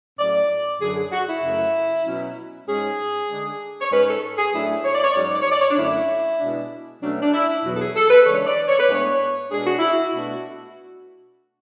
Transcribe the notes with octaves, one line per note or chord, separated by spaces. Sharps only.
A2 F#3 C#4 D5
F#2 D3 F#3 G#4
G#4
F#4
E4
F#2 C#3 F#3 A3
B2 F#3 C#4
G#2 G#3 C#4 G#4
D3 G#3 D4
C#5
G#2 G#3 C#4 B4
A4
G#4
A2 F#3 A3 D4 E4
C#5
D5
C#5
G#2 F#3 C#4 D5
C#5
D5
C#5
D5
C#5
D4
F#2 D3 A3 C#4 E4
B2 G#3 D4
B2 F#3 A3 C#4 D4
D4
E4
E2 B2 F#3 B3 F#4
A4
G#4
A4
B4
C#3 E3 G#3 D4 C#5
D5
C#5
B4
A2 G#3 B3 D4 C#5
B2 G#3 D4 G#4
F#4
E4
F#4
B2 A3 D4